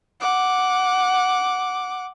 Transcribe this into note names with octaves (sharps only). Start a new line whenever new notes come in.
F#5 D6